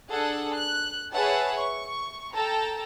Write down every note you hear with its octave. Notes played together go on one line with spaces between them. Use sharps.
D4 G#4 A4 F#5
F#6
G#4 B4 C#5 E5 F#5 A5
C#6
A4 G5 A5 A#5